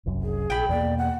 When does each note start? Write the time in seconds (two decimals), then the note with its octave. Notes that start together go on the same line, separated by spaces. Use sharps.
0.06 F#1 C2 F#2
0.23 G#4
0.50 A#1 G5 B5
0.69 E2 B2 A#3 D5
0.98 F#5